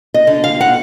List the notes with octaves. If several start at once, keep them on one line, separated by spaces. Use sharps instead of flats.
D#5
D3
F5
F#5